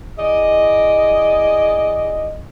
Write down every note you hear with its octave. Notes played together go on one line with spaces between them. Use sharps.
E4 G#4 D5 D#5